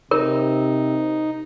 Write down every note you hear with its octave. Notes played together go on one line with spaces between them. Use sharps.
C3 D#4 A#4